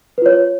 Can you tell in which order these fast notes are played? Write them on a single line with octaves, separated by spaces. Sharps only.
B4 F4 C#5